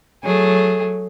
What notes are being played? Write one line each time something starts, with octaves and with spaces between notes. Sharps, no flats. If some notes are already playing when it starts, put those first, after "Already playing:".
F#3 A3 G#4